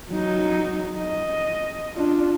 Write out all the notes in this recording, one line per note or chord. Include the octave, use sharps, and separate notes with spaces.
F#3 D#4
D#5
D4 F4